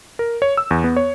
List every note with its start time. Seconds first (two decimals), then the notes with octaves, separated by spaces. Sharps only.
0.19 A#4
0.42 C#5
0.57 E6
0.71 E2
0.84 B3
0.97 C#5